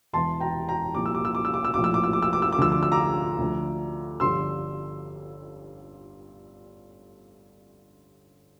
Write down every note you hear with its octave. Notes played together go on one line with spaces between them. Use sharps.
E1 E2 E3 A5 C6
G5 A#5
G5 A#5
C2 A#2 F3 D6
E6
D6
E6
D6
E6
D6
E6
A#1 A2 F3 D6
E6
D6
E6
D6
E6
D6
E6
D6
D2 D3 F3 E6
D6
E6
A#5 D6
D2 D3 F3
G1 G2 D3 F3 C6 E6